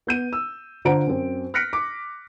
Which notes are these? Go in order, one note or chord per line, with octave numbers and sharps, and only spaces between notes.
B3 G6 D#7
E6
D3 F4 C5 F#5 A#5 D7
F#2 C4
F6 F#6 A#6 B6 C#7 D7
D6